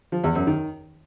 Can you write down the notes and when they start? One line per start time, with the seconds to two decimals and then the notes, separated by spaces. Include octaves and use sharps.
0.12 F3
0.24 E2
0.35 F#2
0.47 D#3